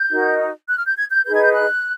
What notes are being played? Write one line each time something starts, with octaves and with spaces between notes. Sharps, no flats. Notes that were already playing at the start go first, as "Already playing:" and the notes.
Already playing: G6
D#4 F#4 A#4
F#6
F6
G6
G#6
G6
D#4 G#4 B4 G6
G#6
G6
F#6